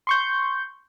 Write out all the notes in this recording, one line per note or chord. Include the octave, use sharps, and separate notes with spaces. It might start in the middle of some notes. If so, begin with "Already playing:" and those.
C6 C#6 G6